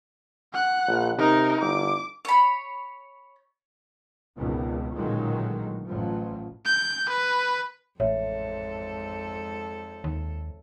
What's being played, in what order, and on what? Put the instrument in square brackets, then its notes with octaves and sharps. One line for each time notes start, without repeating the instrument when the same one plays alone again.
[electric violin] F#5 F#6
[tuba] A#1
[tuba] C3 [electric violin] D#4 A#4
[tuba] G1 [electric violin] D6
[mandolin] C#5 B5
[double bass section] G#1 C#2 B2 D#3
A1 A#2 D3 D#3 F#3 G#3
A1 F3 F#3
[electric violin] G6
B4
[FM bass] A1 [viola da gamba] F2 G#2 A4 [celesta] C#5 E5
[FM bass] D#2